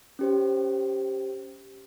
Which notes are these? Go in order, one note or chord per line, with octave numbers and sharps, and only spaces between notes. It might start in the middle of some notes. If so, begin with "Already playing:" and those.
C#4 G4 C5